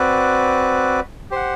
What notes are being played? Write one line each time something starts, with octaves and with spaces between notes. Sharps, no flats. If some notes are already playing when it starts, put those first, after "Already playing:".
Already playing: C4 F#4 B4 D5
G4 C5 F#5